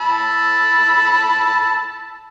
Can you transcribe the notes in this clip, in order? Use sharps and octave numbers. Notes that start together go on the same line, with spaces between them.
A5 B5 E6